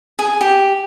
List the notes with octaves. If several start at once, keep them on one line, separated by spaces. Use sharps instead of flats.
G#4
G4